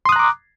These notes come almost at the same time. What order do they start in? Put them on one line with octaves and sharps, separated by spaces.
C6 D#6 F#6 A#5 D6